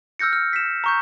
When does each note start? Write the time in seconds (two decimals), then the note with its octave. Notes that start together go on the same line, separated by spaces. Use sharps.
0.19 E6 F6 G6 A#6 C#7
0.33 F6
0.53 B6 E7
0.84 A#5 C#6 G6